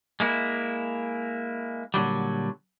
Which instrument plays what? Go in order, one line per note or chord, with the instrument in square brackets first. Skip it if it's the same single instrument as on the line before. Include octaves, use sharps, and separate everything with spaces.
[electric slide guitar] G#3 A#3 E4
A#2 D3 F#3 G3